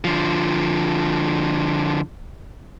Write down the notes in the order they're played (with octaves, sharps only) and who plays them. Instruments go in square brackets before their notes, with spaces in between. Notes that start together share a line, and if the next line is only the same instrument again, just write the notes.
[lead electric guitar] D3 F3